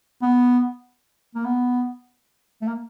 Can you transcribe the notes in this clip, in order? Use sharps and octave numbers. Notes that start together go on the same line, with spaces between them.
B3
A#3
B3
A3
A#3